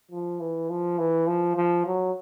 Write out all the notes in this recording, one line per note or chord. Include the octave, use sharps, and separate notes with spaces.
F3
E3
F3
E3
F3
F3
F#3